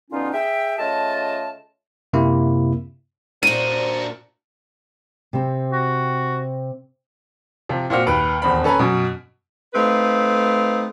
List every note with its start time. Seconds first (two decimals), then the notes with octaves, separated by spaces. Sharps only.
0.11 B2 D3 B3 C#4 D#4 F4
0.34 G#4 E5 G5
0.79 C#3 A3 F4 D#5 A5
2.13 F#2 C3 A#3 E4
3.43 A#2 D4 F#4 A#4 C5 D#7
5.33 C3 C4
5.72 F#4
7.69 C3 F3
7.90 A#2 A#3 C4 F#4 F6 C#7
8.07 D#2 B4 D7
8.42 D#1 E2 C4 B5
8.64 C#4 A4 B4 G#5 A#5
8.79 F#2 B2
9.73 A3 C4 D#4 B4 F5